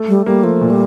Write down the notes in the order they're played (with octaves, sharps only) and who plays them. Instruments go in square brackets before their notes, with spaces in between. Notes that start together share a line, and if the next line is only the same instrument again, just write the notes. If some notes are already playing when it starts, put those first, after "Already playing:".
Already playing: [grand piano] A3
[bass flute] G3
[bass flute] G3 [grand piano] A#3
[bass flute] F3 [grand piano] A3
[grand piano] A#2
[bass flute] G3